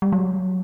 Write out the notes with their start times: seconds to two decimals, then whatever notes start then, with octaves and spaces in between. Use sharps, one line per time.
0.02 G3
0.12 F#3